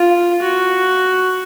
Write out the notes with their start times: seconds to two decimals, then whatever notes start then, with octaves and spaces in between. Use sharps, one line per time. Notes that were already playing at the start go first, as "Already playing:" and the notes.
Already playing: F4
0.42 F#4